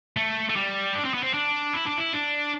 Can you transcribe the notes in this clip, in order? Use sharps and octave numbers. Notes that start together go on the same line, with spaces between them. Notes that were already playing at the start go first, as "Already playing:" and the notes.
A3
A3
G3
D4
C4
B3
C4
D4
E4
D4
E4
D4